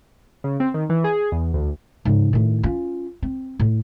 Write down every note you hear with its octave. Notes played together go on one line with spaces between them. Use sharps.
C#3
C4
D#3
E3
G#4
E2
D2
G#2 C#3
A2 D#3
C#4 F4
C4
A2